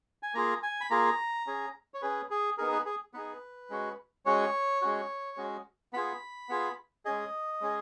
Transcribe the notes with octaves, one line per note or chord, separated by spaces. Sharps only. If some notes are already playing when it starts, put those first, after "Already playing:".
G#5
A#3 F4 G#4 A#5
G#5
B5
A#3 F4 G#4 A#5
C#4 G#4
C#5
C#4 G#4 B4
G#4
B3 D#4 G#4 A#4
B4
G#4
B3 D#4 G#4 B4
G#3 C#4 F#4
G#3 C#4 F#4 C#5
G#3 C#4 F#4
G#3 C#4 F#4
B3 F4 G#4 B5
B3 F4 G#4
G#3 C#4 G#4 D#5
G#3 C#4 G#4